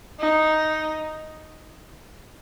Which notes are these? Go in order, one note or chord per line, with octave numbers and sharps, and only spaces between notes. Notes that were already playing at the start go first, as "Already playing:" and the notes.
D#4